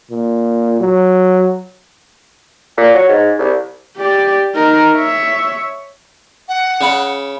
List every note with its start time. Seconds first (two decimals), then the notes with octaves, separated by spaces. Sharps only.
0.11 A#2
0.80 F#3
2.77 A#2
2.94 F#3
3.08 G#2
3.39 C2
3.97 G4 D5
4.54 D#4 A#4
4.96 C#5 E5
6.49 F#5
6.81 C#3 B5